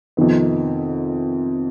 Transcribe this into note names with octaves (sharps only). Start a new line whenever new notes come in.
F2 C3 D#3 B3